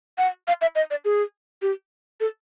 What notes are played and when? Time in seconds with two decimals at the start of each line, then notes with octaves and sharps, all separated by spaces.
0.18 F#5
0.48 F5
0.61 E5
0.75 D#5
0.91 D5
1.05 G#4
1.62 G4
2.20 A4